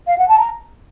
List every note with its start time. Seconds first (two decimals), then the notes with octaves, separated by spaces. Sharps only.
0.07 F5
0.18 F#5
0.28 A5
0.39 A#5